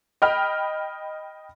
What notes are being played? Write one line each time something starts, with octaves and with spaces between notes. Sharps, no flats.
D#5 G5 B5 F6